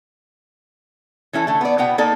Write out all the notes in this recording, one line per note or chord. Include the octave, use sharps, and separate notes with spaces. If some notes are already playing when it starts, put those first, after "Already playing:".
E3 C#4 E4 A4
D3 A3
B3 D5
B2 B3 F#5 G5
A#3 D#4 A4 D5